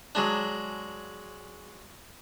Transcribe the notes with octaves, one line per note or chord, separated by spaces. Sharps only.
F#3 G#3 D4